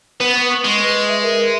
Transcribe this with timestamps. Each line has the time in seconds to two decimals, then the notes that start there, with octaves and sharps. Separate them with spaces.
0.20 B3 B4
0.35 C#6
0.50 C#6
0.64 G#3 C#6
0.80 B4
0.94 B4
1.09 E5
1.24 A#4
1.39 E5